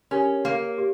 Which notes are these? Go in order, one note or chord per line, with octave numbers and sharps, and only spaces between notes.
C#4 G4 A#4 C#5
A#3
G4